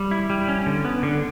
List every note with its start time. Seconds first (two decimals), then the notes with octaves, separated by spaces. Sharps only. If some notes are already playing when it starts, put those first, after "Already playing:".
Already playing: G3
0.11 E4
0.30 G3
0.49 C#4
0.66 D3
0.85 B3
1.03 D3